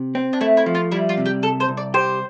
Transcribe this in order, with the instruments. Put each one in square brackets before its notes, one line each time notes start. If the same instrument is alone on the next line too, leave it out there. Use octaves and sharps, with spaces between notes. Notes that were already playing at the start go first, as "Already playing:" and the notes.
Already playing: [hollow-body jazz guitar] C3
C4
[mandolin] D4
[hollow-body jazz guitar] A3 [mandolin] E4
[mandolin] E4
[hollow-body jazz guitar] F3
[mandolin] F4
[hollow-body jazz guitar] G3 [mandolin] E4
[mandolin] F4
[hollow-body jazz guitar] C3
[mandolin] G4
[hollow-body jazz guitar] C2 [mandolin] A4
[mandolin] C5
[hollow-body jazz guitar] C2
[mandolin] D5
[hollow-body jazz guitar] G4 [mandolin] C5